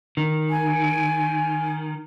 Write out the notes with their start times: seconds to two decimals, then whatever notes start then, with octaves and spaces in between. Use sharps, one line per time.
0.17 D#3
0.50 G#5